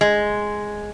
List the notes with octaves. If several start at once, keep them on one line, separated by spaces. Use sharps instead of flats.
G#3